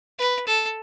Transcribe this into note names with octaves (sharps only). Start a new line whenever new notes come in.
B4
A4